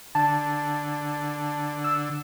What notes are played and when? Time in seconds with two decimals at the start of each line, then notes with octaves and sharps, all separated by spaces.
0.15 D3 A5
1.84 E6